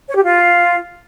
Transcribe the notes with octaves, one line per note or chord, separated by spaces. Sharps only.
C#5
G4
F4